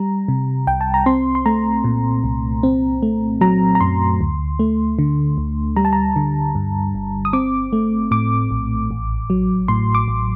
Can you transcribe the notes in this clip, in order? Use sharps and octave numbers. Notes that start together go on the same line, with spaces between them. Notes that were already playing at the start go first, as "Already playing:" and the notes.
Already playing: G3 A#5
C3
C2 G5
A5
A#5
C4 C6
C6
A3 A#5
A#2
C2
C4
A3
F#3 A#5
A#5
F#2 C6
D2
A3
D3
D2
G3 A#5
A5
A#5
D3
G2
G1
D#6
C4 D6
A3
A2 D6
A#1
A1
F#3
A2 C6
D6
A1